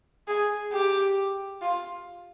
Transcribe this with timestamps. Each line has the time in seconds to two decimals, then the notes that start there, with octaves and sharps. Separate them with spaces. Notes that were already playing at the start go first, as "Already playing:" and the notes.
0.28 G#4
0.73 G4
1.62 F4